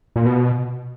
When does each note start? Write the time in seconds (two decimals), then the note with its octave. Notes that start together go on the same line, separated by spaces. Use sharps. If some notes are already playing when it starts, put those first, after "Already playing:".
0.16 A#2
0.26 B2